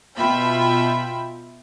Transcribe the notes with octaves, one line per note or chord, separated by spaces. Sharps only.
B2 F4 E5 G5 B5